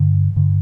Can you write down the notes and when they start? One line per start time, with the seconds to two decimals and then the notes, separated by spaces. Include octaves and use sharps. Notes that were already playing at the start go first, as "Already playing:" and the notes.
Already playing: G2 D3
0.36 G2 D3